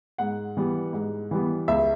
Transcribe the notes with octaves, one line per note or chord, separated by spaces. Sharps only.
G#2 F#5
E3 G3 B3
G#2
E3 G3 B3
C#2 E5